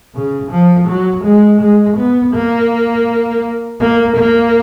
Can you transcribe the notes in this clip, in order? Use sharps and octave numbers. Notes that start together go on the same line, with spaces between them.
C#3
F3
F#3
G#3
G#3
B3
A#3
A#3
A#3